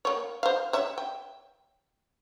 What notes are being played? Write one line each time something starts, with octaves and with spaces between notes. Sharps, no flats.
A#3 C#5
C5 F5
C#5 E5
G5